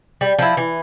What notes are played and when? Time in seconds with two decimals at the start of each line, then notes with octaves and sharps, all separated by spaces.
0.21 G3
0.39 F3 E4
0.57 E3